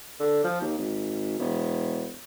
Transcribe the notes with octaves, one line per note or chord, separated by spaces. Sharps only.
D3
F3
D#2
G#1
E1